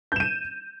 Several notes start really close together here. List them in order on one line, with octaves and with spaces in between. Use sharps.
G6 E7 D#7